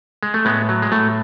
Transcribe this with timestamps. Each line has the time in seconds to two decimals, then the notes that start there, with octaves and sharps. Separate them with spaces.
0.23 G#3
0.34 A3
0.45 A2 G#3 B3
0.69 F#3
0.82 G#3
0.92 A2 A3